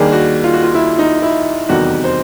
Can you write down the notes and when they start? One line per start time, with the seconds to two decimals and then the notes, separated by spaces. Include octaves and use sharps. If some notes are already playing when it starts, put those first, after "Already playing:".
Already playing: D#2 D#3 G3 A#3 D4 G#4
0.13 F#4
0.44 F4
0.54 F#4
0.63 F4
0.74 E4
0.99 D#4
1.22 E4
1.69 F1 E2 C3 D#3 G3 F#4
2.04 C5